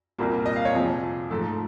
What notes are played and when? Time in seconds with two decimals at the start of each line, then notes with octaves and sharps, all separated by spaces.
0.18 C2 A#2 G3 A#3
0.46 D#5
0.56 F5
0.65 C#5
0.74 F2 C3 F3 G#4
1.30 G#2 F3 A3 A4